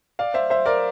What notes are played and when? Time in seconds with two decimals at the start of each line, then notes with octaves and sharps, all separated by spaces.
0.19 D5 F5
0.34 C5 E5
0.50 C5 E5
0.66 A#4 D5